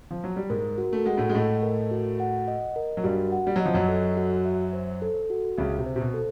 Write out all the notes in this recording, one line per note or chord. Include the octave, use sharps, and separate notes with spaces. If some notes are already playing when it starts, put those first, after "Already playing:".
F3
F#3
G3
G#2 G#3 A#4
F#4
A3
G#3 F#5
A2 A3
G#3
A2 A3 D#5
A#4
F#4
F#5
D#5
A#4
F#3
G2 G3 F#4
F#5
G3
F#3
D#5
F3
F#2 F#3
A4
F#4
E5
C5
A4
F#4
C#2 C#3 E5
C3
C5
C3
B2
A4